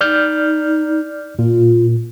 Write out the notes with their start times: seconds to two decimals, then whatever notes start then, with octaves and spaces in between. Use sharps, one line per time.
0.01 D#4 D5 F6 G6
1.39 A#2 F4